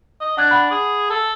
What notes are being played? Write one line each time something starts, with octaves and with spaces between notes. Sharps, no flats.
D#5
D4 F#5 F#6 G#6
F#5 B5
G#4
A4